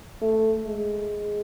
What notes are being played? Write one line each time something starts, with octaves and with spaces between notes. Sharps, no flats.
A3
G#3